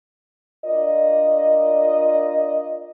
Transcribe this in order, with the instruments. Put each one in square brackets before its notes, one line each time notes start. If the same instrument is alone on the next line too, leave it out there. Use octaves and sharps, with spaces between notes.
[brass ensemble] D4 F4 A#4 D5 D#5